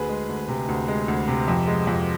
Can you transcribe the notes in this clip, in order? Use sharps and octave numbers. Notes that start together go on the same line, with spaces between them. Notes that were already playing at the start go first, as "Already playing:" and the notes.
Already playing: D2 G#4 B4
G#3
D2
C3
D2
G#3
D2
C3
F2
G#3
F2